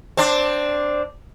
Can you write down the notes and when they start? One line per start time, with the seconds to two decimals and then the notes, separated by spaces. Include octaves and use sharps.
0.17 C4 D4